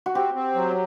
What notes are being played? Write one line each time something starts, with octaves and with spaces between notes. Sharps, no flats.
F#4
C4 G4
C4
F#3